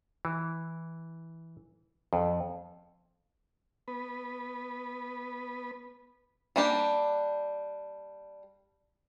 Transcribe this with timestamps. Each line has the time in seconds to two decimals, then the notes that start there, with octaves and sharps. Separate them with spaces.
0.25 E3
2.13 F2
3.88 B3 B4
6.56 G3 A#3 D4 G4